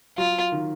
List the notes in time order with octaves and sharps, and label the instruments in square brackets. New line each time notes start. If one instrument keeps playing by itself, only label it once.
[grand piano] F#3 [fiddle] F4
[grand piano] D#3